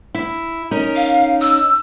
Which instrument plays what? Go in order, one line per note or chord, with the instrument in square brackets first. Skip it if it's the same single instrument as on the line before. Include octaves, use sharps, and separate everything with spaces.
[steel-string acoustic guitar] E4
C#4 D#4 A#4
[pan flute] F5
E6